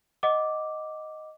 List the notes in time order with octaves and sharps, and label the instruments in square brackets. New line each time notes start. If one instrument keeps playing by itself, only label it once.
[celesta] D#5 F#5 D6